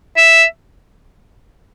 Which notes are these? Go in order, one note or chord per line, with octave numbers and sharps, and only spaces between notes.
E5